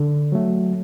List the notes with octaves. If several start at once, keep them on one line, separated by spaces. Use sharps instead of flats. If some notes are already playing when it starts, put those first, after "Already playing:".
Already playing: D3
F#3 A3